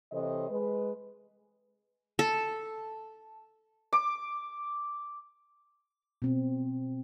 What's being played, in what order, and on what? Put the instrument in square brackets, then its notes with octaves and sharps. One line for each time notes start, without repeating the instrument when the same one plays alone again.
[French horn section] C3 E3 A4 C5 C#5 D#5
G#3 B4
[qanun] A4
[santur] D6
[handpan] B2 C4